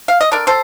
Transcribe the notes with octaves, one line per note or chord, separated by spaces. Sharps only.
F5
D#5
D3 A#4 D5
A4 C5